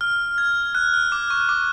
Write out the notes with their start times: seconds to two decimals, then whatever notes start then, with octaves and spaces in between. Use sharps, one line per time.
0.01 F6
0.38 G#6
0.75 F#6
0.94 F6
1.12 D6
1.30 C#6
1.49 D6